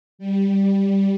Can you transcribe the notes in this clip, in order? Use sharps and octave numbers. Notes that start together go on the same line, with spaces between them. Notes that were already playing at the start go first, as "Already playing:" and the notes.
G3